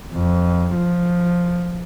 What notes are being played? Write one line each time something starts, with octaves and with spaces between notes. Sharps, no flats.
F2
F3